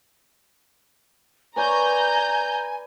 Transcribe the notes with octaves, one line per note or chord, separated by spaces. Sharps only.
B4 C#5 D5 G#5 A#5 G6